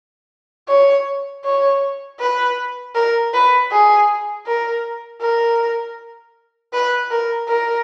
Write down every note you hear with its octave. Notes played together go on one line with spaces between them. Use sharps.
C#5
C#5
B4
A#4
B4
G#4
A#4
A#4
B4
A#4
A#4